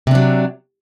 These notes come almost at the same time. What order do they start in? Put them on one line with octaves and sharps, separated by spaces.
C3 D4 F#3